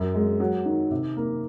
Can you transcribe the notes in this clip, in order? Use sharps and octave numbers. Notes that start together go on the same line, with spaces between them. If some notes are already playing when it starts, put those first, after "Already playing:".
Already playing: F#2
G#3
F#3
D#3
C3
A#3